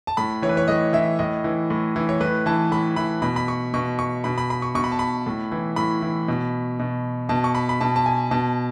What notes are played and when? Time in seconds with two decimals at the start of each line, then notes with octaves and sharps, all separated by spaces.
0.07 A5
0.17 A2 B5
0.42 E3 C#5
0.49 B4
0.57 C#5
0.68 A2 D#5
0.93 E3 E5
1.19 A2 D#5
1.44 E3
1.70 A2
1.96 E3
2.09 C#5
2.20 A2 B4
2.46 E3 A5
2.72 A2 B5
2.96 E3 B5
3.22 B2 B5
3.36 B5
3.48 C#6
3.74 B2 C#6
3.99 C#6
4.24 B2 B5
4.38 B5
4.50 B5
4.62 C#6
4.75 B2 C#6
4.84 B5
4.92 A5
4.99 B5
5.26 A2
5.52 E3
5.76 A2 B5
6.02 E3
6.28 B2
6.79 B2
7.29 B2 A5
7.44 C#6
7.55 B5
7.69 B5
7.81 B2 A5
7.96 A5
8.06 G#5
8.31 B2 A5